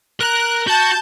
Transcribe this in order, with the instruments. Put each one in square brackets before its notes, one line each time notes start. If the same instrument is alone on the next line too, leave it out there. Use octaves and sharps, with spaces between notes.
[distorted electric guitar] A#4 A#5 [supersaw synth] F#6
[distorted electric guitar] F#4 [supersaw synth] A5 G6